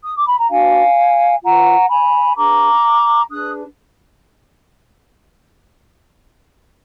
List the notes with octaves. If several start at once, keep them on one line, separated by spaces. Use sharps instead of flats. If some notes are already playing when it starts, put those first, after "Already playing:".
D#6
D6
B5
A#5
D4 F#4 B4 F5 G#5
F4 B4 F#5 A#5
G#5 B5
D4 G#4 B4 A#5 D6
D4 G#4 B4 D#6 F#6